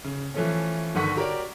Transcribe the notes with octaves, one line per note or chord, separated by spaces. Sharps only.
C#3
E3 F3 A3 C#4
G1 D3 D#3 F#5 C#6 B6
F#4 G4 A#4 C#5 D5